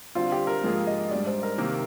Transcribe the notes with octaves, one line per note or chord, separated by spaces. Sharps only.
D3 G3 C4 F4
G4
A#4
G#2 F3 A#3 F4 G#4
D#5
G#2 G3 D4 D5
C5
A#4
C3 D#3 A#3